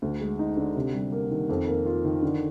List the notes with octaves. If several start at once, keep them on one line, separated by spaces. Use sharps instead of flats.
D2
G#3
D#4
D3
C3
G3
A#3
D#3
F2
A#3
F4
D#3
D3